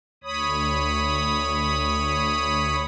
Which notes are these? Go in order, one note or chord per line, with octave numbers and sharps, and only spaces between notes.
D2 C#5 B5 D#6